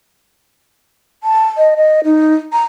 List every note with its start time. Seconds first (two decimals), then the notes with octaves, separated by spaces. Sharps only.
1.23 A5
1.57 D#5
1.76 D#5
2.04 D#4
2.53 A#5